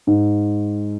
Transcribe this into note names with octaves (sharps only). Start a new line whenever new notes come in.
G#2